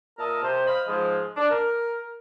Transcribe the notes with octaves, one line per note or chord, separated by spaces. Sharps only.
A#2 A#4 D#5 E5 A5
C3 C5
C5 D#5 F5 B5
G#2 F3 G#3
D4
A#4